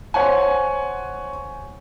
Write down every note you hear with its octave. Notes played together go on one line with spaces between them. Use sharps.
C5 C#5 F#5 G#5